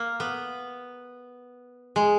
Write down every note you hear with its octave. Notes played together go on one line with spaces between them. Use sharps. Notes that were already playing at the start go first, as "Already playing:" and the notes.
Already playing: A#3
B3
G#3